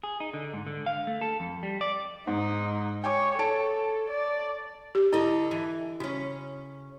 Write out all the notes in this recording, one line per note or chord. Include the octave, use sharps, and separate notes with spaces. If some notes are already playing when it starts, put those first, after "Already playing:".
G#4
D#4
D3
G#2
D3
F5
A3
A4
F2
G3
D5
G#2 D#4
C#5 G5 G#5 D6
A4 C#5 A5 D7
D5
G4
D3 E4 A4 D#5
E3
C#3 C#4 F#4